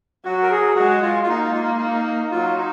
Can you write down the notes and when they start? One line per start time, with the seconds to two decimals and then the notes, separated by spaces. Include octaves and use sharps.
0.25 F#3 F#4
0.43 A#4
0.51 G#4
0.76 G#3 F#4
1.02 F4
1.23 F4
1.28 A#3 D#4
1.53 F4
1.63 D#4
1.79 D#4
2.31 F#3 F4
2.57 D#4